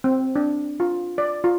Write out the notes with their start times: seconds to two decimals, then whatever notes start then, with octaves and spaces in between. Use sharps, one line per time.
0.04 C4
0.36 D4
0.80 F4
1.18 D5
1.44 F4